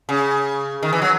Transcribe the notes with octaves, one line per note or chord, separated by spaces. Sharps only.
C#3
D#3
E3
F#3